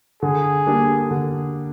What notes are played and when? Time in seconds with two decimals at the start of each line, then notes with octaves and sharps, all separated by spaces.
0.23 D3 G#4
0.67 G3 A#3 D4
1.11 D3